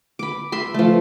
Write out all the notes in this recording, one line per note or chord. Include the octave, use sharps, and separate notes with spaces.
B5 D6
E5 B5 C6
F3 A3